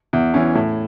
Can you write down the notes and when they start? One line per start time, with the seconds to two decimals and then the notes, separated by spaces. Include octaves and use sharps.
0.13 E2
0.34 E3 C#4
0.55 A2